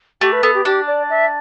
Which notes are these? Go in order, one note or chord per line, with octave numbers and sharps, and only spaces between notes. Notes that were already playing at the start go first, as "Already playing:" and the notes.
A3 G4
B4
B3 A4
G4
D4 G4
D5
E5